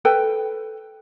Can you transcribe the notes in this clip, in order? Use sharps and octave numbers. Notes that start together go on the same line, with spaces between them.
A4 B4 G5